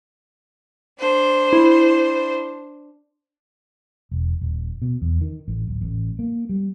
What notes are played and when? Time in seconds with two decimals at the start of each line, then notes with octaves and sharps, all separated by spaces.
1.00 D4 C5
1.53 E4
4.11 E1
4.41 D#1
4.82 B2
5.02 E2
5.21 D#3
5.48 A1
5.67 D1
5.81 A1
6.19 A#3
6.49 G3